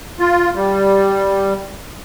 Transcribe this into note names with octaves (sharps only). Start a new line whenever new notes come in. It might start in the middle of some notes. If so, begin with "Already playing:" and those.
F4
G3